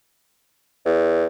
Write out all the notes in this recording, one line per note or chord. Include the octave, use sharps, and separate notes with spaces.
E2